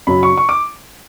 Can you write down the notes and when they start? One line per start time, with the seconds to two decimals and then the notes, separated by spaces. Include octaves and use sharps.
0.07 F#2 C#3 F#3 C#4 B5
0.23 C#6
0.37 C#6
0.49 D6